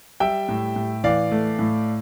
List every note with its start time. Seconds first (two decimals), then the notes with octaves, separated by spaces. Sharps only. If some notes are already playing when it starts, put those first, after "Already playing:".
0.20 G3 E5 G5
0.49 A2
0.76 A2
1.04 E3 D5 F5
1.31 A3
1.59 A2